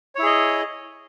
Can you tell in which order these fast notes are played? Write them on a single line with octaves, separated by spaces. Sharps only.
C#5 E4 G#4 D#5